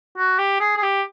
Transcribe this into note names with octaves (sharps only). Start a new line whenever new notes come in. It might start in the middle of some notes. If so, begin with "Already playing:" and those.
F#4
G4
G#4
G#4
G4